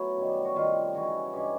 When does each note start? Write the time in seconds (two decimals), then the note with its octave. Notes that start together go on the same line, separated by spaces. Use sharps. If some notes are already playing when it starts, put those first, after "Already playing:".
Already playing: F#3 A3 B3 E4 F#4
0.17 F#2 D#3 G3
0.45 F#4
0.56 C3 D#3 G3 F4
0.94 C#3 E3 G#3 F#4
1.33 G2 E3 G#3 C#4 G4